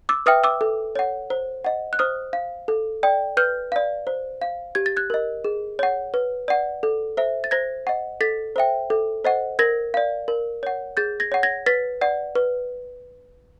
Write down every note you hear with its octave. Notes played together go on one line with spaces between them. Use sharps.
D6 E6
B4 E5 G5 D#6 F6
D6 E6
A4
C#5 F#5
C5
D#5 F#5
F#6
C5 D#6 F6
F5
A4
D5 G5
B4 F6 G6
D5 F5
C5
F5
G4 G#6
A6
F#6 G#6
A#4 D#5
G#4
C#5 F#5
B4
D5 F#5
A4
C5 E5
A6
C5 G#6 A#6
D#5 F#5
A4 A6 B6
C5 E5 G5
A4
C5 D#5 F#5
A#4 G#6 A#6
D5 F5
A#4
C#5 F#5
G#4 G6 A6
G#6 A#6
C#5 F#5
G#6 A#6
B4 A6 B6
D5 F#5
B4